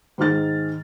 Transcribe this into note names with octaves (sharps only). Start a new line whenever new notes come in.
G#2 D#3 G#3 F6 A6